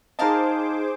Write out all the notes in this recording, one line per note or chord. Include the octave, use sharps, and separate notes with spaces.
D#4 G#4 A#4 C5 D#5 F5 A5 D6